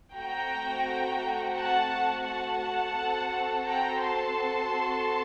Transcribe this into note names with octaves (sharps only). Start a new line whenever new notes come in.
A3 C4 F#4 G5 A#5
F#5 A5
F#5 A5
C4 F#4 A4
G5 A#5
A5 C6